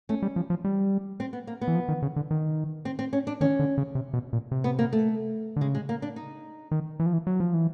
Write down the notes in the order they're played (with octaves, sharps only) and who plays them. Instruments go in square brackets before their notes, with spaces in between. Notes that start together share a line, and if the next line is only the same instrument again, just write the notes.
[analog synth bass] A3 [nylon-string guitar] C#4
[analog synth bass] G3
F3
F3
G3
[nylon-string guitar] C4
B3
A#3
B3
[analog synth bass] E3
F3
D#3
C#3
D3
D#3
[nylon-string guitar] C4
C4
C#4
D4
[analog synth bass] D#3 [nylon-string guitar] C#4
[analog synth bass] D3
C#3
C3
B2
A#2
C3
[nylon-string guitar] B3
A#3
A3
[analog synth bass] D3
[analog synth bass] C#3 [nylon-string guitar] G#3
[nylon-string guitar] G#3
A#3
D4
D#4
[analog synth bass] D#3
E3
F3
E3
F#3
F3
E3